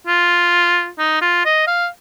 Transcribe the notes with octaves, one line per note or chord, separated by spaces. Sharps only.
F4
D#4
F4
D#5
F5